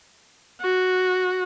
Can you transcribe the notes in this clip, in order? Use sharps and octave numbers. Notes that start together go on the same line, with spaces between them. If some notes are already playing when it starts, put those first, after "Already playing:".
F#4